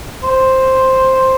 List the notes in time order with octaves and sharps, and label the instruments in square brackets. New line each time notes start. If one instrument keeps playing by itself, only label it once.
[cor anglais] C5